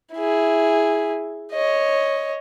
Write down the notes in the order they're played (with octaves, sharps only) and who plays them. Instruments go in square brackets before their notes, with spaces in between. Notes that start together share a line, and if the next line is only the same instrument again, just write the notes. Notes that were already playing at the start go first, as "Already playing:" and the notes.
[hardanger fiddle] E4 G#4
C#5 D#5